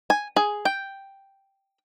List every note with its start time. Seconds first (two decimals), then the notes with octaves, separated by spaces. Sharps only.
0.10 G#5
0.36 G#4
0.65 G5